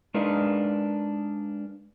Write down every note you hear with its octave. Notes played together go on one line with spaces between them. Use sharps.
G#3 D4 D#4 A#4 B4 F5